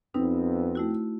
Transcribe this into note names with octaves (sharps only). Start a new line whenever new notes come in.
F2 B3 C4 D#4 B4
A3 E4 F#4